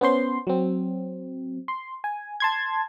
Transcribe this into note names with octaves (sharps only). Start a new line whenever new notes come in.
B3 C#4 C5 C6
F#3 C4
C6
G#5
A5 C6 G#6